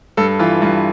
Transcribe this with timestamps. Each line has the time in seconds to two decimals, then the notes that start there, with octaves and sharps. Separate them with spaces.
0.17 G2 A4
0.39 E3 F4
0.62 G2